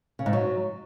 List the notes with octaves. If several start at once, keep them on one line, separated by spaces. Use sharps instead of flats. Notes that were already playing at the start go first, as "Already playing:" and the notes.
C#3
G#2
F#3